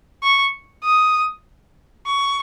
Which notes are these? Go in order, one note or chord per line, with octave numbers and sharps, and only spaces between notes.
C#6
D#6
C#6